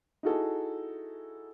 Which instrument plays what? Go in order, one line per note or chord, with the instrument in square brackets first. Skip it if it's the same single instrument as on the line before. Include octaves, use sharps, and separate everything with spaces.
[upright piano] D#4 E4 F#4 G#4 A4